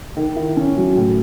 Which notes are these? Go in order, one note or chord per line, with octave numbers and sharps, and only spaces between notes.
D#3
E4
C#4
F#3
A2